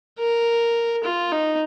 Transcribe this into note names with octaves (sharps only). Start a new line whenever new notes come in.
A#4
F4
D#4